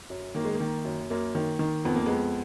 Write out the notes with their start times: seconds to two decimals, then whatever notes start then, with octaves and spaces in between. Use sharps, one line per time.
0.10 F#2
0.35 D#3 A#3
0.45 G#3
0.54 A#3
0.60 D#3
0.85 F#2
1.10 F#2 A#3
1.35 D#3
1.59 D#3
1.85 F2 B3
1.95 A#3
2.06 F2 G#3 B3